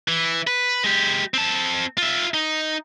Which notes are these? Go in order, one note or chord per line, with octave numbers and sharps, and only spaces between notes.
E3
B4
G#3 G4
C4 A5
F4 E5
D#4